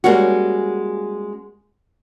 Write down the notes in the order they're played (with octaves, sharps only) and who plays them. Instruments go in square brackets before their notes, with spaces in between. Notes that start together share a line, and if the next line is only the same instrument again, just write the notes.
[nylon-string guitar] G3 G#3 A#3 C#4 F#4